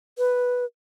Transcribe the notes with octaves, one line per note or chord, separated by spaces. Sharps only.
B4